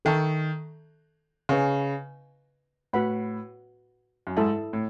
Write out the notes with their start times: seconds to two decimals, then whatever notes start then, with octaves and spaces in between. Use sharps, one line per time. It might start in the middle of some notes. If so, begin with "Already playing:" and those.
0.05 D#3 A4 E5 A5 C#6
1.49 C#3 B4 D#5 G#5 C#6
2.93 A2 F#4 B4 F#5 B5
4.27 F#2
4.37 G#2 E4 A4 E5 A5
4.73 A2